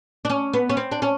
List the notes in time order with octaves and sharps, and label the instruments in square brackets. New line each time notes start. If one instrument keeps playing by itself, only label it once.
[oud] D4
C#4
B3
C#4
C4
D4
C#4